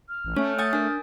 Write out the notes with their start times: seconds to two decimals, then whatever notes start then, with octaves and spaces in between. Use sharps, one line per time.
0.09 F6
0.25 A1
0.36 A3 C#4 C#5 G#5
0.59 F#5 G#5 D#6 G6 A6
0.73 D4 A#4 G#5